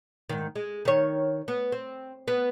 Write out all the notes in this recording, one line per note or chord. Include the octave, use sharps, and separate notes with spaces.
G#2 D#3
G#3
D#3 C#5
B3
C4
B3